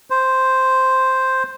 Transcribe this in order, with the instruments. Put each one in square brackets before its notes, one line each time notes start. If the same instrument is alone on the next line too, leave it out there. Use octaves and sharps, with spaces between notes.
[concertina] C5